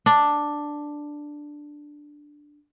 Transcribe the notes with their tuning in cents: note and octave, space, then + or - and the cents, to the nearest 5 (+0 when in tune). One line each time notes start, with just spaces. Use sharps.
D4 +5